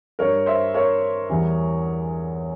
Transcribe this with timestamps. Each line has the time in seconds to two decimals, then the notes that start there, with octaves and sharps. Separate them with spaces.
0.19 G2 G3 A#4 C#5
0.46 C5 E5
0.74 A#4 C#5
1.29 E2 E3 G3